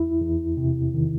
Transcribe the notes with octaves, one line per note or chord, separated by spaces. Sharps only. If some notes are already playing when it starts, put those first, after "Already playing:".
Already playing: E2 E4
E2
C3
D#3